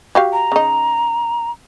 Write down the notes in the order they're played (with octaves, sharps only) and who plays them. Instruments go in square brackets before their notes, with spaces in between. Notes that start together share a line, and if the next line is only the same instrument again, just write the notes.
[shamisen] F#4 G4 F5
[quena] A#5
[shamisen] C#3 D#4